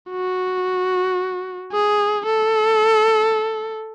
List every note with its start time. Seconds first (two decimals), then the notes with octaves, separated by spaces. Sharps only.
0.11 F#4
1.72 G#4
2.26 A4